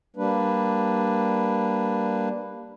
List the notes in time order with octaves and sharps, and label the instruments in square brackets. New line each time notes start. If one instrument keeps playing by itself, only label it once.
[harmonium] G3 A#3 D4 B4